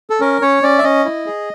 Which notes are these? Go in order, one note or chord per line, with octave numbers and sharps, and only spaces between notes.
A4
C#4 A#4
C#4 C#5
C#4 D5
E5
C#4 D#5
E4
G#4